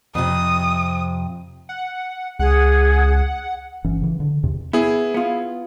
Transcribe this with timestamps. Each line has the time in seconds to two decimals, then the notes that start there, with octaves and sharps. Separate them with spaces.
0.15 F2 C3 D#6
1.69 F#5
2.39 C#2 G#4 F#5
3.85 G1 E3 C#4
4.02 C#3 E3
4.20 D3
4.43 E2 C3
4.73 B3 E4 G#4
5.14 B3 F4